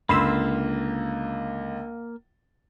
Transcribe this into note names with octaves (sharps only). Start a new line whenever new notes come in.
C#2 D3 A#3 B5 C6 E6